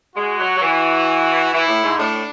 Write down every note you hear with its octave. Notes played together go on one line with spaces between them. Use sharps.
G#3 F#4
F#3
F#3
E3
E3 E4
A2
G#2
A2 D4